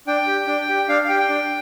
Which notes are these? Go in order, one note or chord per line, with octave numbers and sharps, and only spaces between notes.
D4 G5
G4
D4
G4
D4 F5
F5
G4 G5
G5
D4